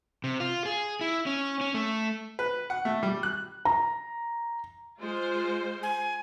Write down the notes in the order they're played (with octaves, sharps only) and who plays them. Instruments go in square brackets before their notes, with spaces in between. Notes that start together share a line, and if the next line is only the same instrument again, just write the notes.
[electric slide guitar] C3
F4
G#4
E4
C#4
C#4
A3
[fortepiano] B4
F#5
A3
G3
F#6
[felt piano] A#5
[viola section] G#3 F4 C5
[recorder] G#5